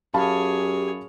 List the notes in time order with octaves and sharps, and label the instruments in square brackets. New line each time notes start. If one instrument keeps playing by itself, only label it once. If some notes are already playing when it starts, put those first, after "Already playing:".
[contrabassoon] F#2 [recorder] G4 [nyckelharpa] G#4 C#5 [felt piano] F5 A5 B5